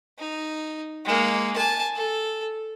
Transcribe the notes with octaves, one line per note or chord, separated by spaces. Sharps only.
D#4
G#3 A#3
G#5 A5
A4